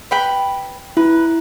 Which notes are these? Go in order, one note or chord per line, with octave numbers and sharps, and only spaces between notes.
B4 G5 B5
E4 B4